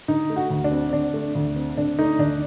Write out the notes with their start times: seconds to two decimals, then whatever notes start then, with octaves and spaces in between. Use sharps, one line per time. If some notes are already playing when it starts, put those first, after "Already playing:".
0.08 D3 D#4
0.30 A3
0.36 F#4
0.50 D2
0.64 D4
0.71 C4
0.93 D3 D4
1.14 A3
1.35 D2
1.56 C4
1.77 D3 D4
1.99 A3 D#4
2.19 D2 D4